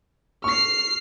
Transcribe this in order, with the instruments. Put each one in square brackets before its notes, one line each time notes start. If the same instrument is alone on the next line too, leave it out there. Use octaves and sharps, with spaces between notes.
[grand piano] C#6 [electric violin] F6 C7